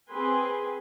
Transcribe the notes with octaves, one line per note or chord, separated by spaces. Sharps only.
C4 G#4 B4 G#5 C6